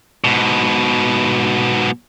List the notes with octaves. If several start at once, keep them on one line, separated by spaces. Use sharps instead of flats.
G#2 B2